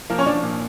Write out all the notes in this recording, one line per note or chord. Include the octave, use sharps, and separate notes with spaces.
F3 A#3 A#4
C#4 C#5
F3 D4 D5
A#2